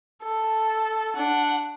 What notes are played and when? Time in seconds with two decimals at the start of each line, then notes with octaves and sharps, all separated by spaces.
0.23 A4
1.17 D4 F#5